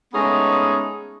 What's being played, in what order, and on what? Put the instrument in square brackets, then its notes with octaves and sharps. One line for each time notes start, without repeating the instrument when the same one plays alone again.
[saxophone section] G#3 A3 B3 C#4 D#4 G#4